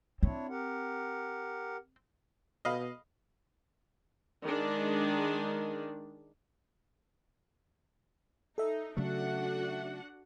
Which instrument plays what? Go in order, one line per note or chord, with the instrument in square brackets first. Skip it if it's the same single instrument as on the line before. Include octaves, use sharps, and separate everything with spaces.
[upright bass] C4 [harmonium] D4 E4 C#5
[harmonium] G4 A#4 F#5
[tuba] B2 [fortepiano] D#5 F5 B5
[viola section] D#3 G#3 D4
[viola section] D#4 [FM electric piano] A4 E5
[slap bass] C#3 F#3 A3 [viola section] D4 F#4 F#5